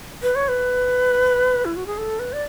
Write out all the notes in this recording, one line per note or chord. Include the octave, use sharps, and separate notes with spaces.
B4
C#5
B4
E4
F#4
G#4
A4
B4
D5